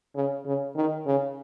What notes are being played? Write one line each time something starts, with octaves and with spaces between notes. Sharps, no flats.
C#3
C#3
D#3
C#3